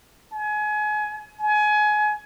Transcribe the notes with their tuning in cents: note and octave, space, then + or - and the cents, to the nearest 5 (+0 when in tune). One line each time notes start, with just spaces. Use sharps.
G#5 +30
G#5 +25